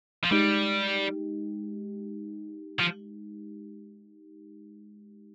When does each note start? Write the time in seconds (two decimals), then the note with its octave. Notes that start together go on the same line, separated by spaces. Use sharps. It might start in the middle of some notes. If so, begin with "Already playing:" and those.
0.24 F3
0.31 G3 G#3 D#4 G4
2.80 F3